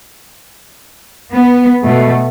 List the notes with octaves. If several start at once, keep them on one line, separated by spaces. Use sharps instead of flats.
B3
B2 A3